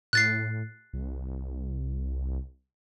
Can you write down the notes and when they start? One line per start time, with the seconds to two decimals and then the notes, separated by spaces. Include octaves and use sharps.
0.13 A2 F#6 A6 C7
0.93 C2